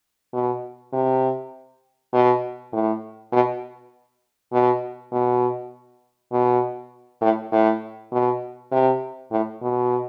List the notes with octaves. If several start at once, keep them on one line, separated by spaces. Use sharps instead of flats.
B2
C3
B2
A2
B2
B2
B2
B2
A2
A2
B2
C3
A2
B2